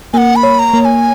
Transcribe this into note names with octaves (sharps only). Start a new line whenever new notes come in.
A#3 F#5 G#5
B5
C#5
A#5
A#3
A#5
G#5